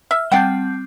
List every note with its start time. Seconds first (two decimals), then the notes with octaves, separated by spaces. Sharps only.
0.11 E5 F6
0.32 G3 C4 F#5 G5 A5 G6